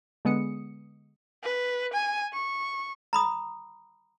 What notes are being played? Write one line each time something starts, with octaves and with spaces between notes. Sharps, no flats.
D3 G#3 B3 D#6 C#7
B4
G#5
C#6
A#5 B5 D#6